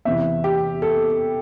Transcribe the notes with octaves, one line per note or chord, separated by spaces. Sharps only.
E2 C3 E3 E5
G4
A4